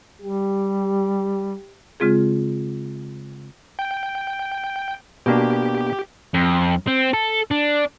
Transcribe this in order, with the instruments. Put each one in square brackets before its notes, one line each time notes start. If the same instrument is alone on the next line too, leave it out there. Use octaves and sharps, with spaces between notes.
[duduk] G3 [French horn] G4
[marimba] C#3 G#3 C4 F4 G#4
[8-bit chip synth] G5
[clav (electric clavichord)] B2 A#3 D4 [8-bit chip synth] G4
[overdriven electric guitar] F2
C4
A4
D4